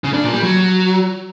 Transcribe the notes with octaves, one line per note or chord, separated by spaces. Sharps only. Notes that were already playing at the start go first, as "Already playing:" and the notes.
C#3
D4
A#2
G3
F#3